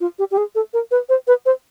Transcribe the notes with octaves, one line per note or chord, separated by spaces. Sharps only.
F4
G4
G4
G#4
A4
A#4
B4
C5
B4
C5